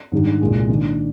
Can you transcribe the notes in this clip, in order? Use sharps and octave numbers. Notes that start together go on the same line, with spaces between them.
G#2 D#3 G3 D4 G4
C2 A#2 G#3
D#3 A#3 D4